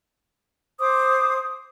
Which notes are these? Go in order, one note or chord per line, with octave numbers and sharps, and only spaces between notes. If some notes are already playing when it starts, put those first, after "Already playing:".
C5 D6 D#6